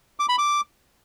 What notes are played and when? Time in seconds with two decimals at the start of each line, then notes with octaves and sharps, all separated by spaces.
0.20 D6
0.29 B5
0.38 D6